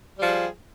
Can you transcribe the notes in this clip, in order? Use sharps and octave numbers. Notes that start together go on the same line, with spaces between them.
F3 G3 G#4